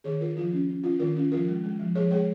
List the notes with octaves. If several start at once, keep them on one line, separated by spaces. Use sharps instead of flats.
D#3 G#4 C#5
D#3 F4 A#4
F3 F4
C#4
C#4
C#4 F4
D#3 F4 A#4
C#4 F4
F3 F4 A#4
G#3
G#3
F3
F3 G#4 C#5
G#3 G#4 C#5